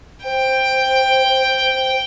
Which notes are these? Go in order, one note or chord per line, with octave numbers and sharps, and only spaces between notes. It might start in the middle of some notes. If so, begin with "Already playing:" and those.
C5 G5